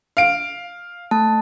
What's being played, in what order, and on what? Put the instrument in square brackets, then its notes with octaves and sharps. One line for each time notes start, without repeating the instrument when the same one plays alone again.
[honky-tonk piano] F5 D7
[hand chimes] A3 A5